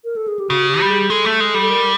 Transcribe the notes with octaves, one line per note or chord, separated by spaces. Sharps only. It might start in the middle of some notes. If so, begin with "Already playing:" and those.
A#4
A4
G#4
G4
C#3 F#4
G4
G3
G#4
G#3 A4
A3
G#3
G3
A4
A#4